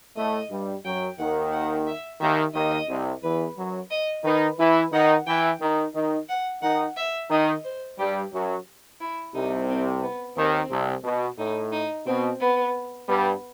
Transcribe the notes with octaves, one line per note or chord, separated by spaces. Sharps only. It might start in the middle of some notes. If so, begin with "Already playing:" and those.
A2 A3 D#5
G2 G3
F#2 F#3 G5
D#2 D#3 F#5
F#5
E5
D#2 D#3 E5
D#2 D#3 D#5
C2 C3
E2 E3 B4
F#2 F#3
D#5
D#3 D#4 B4
E3 E4 B4
D#3 D#4 F#5
E3 E4 G5
D#3 D#4
D#3 D#4
F#5
D#3 D#4 F#5
E5
D#3 D#4 D#5
C5
G2 G3 G4
F#2 F#3
E4
C2 C3 D#4
C4
B3
D#2 D#3 C4
C2 C3
B2
A2 D#4
D#4
B2 C4
B3
G2 G3 B3